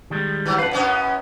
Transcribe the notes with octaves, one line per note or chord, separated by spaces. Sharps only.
D#3 G3 G#3
E3 F#3
F2 B4 F5 F#5
F#2 B3 C#4